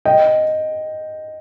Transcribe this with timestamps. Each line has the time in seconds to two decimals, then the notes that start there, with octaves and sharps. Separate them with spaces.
0.05 D#5 G5